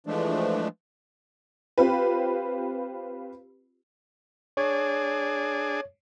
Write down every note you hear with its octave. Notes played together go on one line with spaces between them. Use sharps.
E3 F3 G#3 A3 D4
C4 F4 G4 B4
D4 G#4 C#5